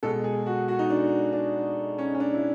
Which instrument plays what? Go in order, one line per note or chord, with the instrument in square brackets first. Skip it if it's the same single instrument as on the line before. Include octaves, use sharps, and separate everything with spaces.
[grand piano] B2 G#3 A4
G#4
F#4
F#4
D#4
D4
D4
C#4
C#4
D4
E4